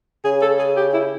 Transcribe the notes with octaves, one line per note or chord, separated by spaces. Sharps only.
C#3 G#4
A4
G#4
G4
E4